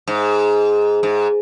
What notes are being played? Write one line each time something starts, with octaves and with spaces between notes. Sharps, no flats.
G#2
G#2